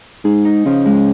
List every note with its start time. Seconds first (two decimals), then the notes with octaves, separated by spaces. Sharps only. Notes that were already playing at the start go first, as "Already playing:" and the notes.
0.24 G#2 G#4
0.45 D#4
0.65 C#3 F3
0.85 G#3